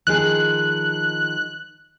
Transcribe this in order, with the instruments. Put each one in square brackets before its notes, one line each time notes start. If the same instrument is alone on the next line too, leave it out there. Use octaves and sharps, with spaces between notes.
[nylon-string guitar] D#3 F3 G#4 [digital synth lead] F#6